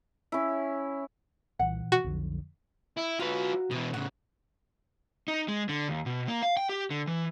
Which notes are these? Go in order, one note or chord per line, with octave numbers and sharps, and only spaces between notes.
C#4 E4
C2 A#2 E3 F#5
B2 F#4
B1 F2 D3 F3
E4
F#3 F4 F#4 B4 F5
B2 E3 D#5
A2 C#3 F#5
D#4
G#3
D3
D#2
B2
A#3
F5
G5
G4
D3
E3